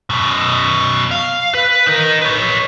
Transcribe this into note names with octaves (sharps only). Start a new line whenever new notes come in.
F#2 B2
F5
B4
D#4 A#4
B4 C#5